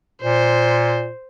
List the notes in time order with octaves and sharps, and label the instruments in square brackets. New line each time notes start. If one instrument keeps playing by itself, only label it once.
[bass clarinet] A#2 [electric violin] C5